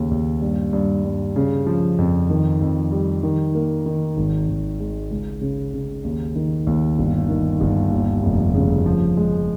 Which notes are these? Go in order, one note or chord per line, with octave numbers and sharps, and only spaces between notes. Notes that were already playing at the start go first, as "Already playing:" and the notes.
Already playing: D#2 C#3
D#2
G2
G2
G2
C#3
F3
F2
D#3
F2
G3
D#3
A#3
D#3
G#1
G#1
G#3
C#2
C#3
C#3
D#2
D#3
D#2
G1
D#3
G1
D#2
F1
C#3
F3
G#3